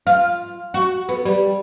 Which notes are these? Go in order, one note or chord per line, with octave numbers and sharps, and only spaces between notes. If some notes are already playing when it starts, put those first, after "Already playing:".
F4
F#4
B3
G3